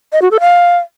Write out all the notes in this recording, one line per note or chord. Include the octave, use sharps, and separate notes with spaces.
D#5
F#4
A4
F5